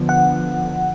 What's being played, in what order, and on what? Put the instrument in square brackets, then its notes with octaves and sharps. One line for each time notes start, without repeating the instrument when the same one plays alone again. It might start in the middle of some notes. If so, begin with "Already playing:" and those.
Already playing: [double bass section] D3 F3 B3
[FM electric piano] F#5